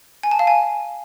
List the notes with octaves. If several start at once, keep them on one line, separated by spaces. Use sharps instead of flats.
G#5
A5
F5
G#5